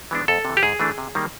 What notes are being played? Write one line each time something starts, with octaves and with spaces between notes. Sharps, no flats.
E3 G#3 B3 D4
F2 A4
C3 E3
G4
G#2 G#4
E3 A3 D4
C3
D#3 G3 A#3